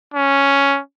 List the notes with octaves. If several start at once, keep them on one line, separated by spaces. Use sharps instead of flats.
C#4